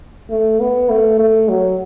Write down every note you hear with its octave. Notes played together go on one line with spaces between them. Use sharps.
A3
B3
A3
A3
F#3